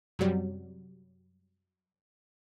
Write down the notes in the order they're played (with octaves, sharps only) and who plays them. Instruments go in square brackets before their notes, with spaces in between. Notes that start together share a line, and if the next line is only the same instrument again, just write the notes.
[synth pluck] F#2 C3 F#3 G3